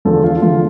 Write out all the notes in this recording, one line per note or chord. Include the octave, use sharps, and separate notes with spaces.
E2 D3 F3 A4
F4
E2 D3 F3 F4